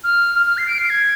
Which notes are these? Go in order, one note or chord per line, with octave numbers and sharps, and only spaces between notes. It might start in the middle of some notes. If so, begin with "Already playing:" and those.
F6
F6
F6
C7
D7
C7
G#6